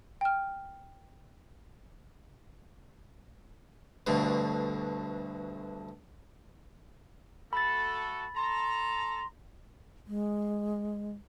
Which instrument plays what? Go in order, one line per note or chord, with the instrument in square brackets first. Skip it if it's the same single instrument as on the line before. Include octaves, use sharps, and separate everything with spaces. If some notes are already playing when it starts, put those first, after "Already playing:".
[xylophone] G5 F6
[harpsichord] D2 G2 B2 D3
[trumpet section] A3 F#4 A4 [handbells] B5 A6
[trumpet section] A4 A5 A#5 [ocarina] C6
[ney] G#3